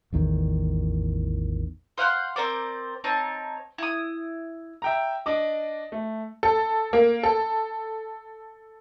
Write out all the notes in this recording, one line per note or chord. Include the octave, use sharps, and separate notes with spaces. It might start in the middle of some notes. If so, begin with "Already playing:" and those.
A1 E2 D#3
C5 F5 F#5 C6
C4 A#4 C5 D5
C4 D#4 C#5 A5
E4 D#6
E5 G5 A#5
D4 D#5 D6
A3
A4
A#3
A4